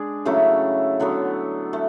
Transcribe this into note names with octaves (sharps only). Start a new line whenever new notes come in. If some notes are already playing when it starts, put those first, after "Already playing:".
Already playing: G#3 D4 G#4
C#3 F#3 A3 E4
D3 F#3 B3
A3